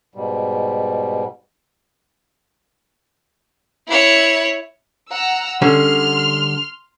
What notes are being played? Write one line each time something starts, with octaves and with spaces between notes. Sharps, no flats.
G#2 B2 G3
E4 C#5
F#5 A#5 E6
D3 G3 C#4 C6 F6